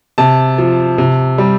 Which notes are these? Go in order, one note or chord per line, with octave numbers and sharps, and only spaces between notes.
C3 A5
F3
C3
G3